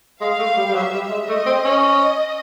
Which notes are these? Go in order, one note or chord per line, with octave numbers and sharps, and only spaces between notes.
G#3 F5
A3
G3
G3
F#3 E5
G3
G#3
A3 D#5
C4
C#4